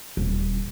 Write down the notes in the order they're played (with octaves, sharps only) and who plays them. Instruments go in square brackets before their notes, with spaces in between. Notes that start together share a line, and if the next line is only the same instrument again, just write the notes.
[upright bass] D#1